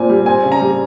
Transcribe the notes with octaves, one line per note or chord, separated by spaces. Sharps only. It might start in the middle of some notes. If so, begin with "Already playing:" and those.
Already playing: A#2 C4 G#5
G3
C4 G#5
C#3
A#5
G3